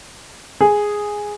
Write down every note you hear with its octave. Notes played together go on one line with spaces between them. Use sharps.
G#4